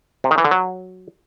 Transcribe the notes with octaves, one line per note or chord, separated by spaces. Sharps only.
C3
D#3
E3
D3
F#3